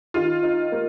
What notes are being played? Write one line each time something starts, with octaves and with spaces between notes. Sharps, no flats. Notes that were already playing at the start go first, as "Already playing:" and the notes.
D#3 F4
D#4
A#3